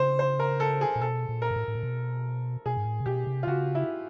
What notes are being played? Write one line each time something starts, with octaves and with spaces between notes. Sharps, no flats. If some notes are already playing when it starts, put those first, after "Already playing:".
Already playing: C#3 C5
C5
A#4
A4
G#4
A#2
B2 A4
A#2
A#4
G#2
A2
A2
A#2
B2
B2 G#4
G#2
A2
C3
B2 G4
C3
F4
C#3 F#4
E4